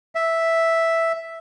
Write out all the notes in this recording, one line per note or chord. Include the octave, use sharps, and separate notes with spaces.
E5